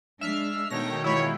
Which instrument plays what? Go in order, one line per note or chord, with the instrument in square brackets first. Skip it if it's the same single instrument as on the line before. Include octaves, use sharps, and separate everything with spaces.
[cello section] G#3 D4 [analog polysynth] E5 F6 C7
[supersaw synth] B2 D#3 G5 [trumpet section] A3 C#5 [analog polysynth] A#6
[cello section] E3 G#3 F4 [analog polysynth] E4 [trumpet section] C#5